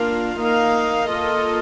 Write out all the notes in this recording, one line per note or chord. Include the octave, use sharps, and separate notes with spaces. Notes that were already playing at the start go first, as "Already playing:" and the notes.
Already playing: A#3 D4 F4 A#4 F5
A#3 D#4 A#4 F5
A#3 F4 A4 D#5